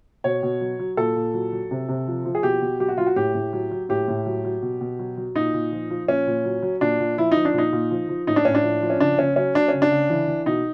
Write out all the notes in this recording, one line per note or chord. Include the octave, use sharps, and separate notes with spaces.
B2 C#5
B2
F#3
F#3
A#2 A4
A#2
F#3
F#3
C3
C3
F3
F3
G#4
B2 G4
B2
F#3 G4
F#4
F#3 F4
F#4
A2 G4
A2
F#3
F#3
A2 G4
A2
F#3
F#3
B2
B2
F#3
F#3
A#2 D#4
A#2
F3
F3
A#2 C#4
A#2
F#3
F#3
A#2 D4
A#2
F3 E4
F3 D#4
D4
A#2 D#4
A#2
F3
F3
A2 D#4
D4
A2 C#4
D4
F3
F3
C#4
C#3 D4
C#3 C#4
F#3 C#4
F#3 D4
C#3 C#4
D4
C#3
E3
E3
B2 D#4